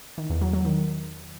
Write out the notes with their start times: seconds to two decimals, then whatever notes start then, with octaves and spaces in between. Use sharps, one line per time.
0.18 D#3
0.30 E2
0.41 F#3
0.53 F#3
0.65 D#3